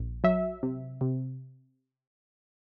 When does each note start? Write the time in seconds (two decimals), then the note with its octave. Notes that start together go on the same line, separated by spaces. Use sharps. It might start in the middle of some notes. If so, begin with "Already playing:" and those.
Already playing: A#1
0.24 F#3 E5
0.63 C3
1.01 C3